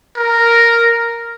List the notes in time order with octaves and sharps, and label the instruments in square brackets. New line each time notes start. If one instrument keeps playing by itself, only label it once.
[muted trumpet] A#4